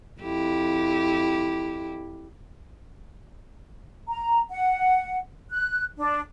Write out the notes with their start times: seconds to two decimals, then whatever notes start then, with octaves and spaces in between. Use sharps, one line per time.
0.21 F2 E4 G4
4.08 A#5
4.51 F#5
5.50 F#6
5.98 D4